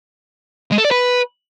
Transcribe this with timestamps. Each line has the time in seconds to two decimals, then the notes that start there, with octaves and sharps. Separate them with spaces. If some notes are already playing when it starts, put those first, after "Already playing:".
0.71 G#3
0.78 A4
0.85 D5
0.91 B4